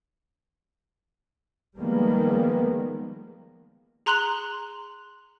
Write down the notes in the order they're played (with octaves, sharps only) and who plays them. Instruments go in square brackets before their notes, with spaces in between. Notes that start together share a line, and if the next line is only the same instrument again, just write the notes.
[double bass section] D#3 F3 G3 G#3 A#3 B3
[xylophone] G#4 A#5 C6 F#6 F7 F#7